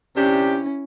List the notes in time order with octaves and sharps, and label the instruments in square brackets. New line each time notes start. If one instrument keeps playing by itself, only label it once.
[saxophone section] C3 D4 G4 [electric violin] C#4 E4